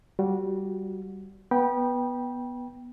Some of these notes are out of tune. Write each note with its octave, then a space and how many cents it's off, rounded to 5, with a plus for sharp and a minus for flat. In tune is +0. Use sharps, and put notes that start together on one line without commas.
G3 -20 F#4 -20
B3 -10 G5 +0 B5 -30